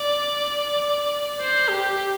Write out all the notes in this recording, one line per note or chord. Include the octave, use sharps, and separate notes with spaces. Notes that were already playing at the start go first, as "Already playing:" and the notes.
Already playing: D5
C5
G4